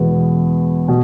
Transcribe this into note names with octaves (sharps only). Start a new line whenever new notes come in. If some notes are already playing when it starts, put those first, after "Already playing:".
Already playing: E2 B2 G#3 B3
B2